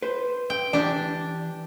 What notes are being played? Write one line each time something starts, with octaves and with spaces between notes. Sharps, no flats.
B4 C5
G5
E3 D4 G4 D5